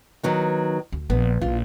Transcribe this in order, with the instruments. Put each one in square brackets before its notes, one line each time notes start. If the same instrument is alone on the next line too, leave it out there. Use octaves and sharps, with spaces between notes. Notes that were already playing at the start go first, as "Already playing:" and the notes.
[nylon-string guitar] D#3 F#3 B3
[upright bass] D2
[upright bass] A#1 [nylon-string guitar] B3
[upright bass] A#1 A#2 [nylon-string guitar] F4